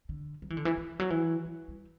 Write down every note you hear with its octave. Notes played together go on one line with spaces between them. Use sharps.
D3
F#3
E3
D3
E3
E3
F#3
E3
F#3
G3